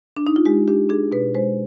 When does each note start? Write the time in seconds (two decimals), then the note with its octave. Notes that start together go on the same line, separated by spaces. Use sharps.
0.17 D4
0.27 D#4
0.36 F4
0.45 G#3 G4
0.68 D4 G4
0.89 D4 G#4
1.12 B2 B4
1.35 G#3 C5